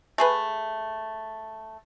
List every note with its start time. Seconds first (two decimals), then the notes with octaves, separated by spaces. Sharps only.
0.18 A3 G#4 B4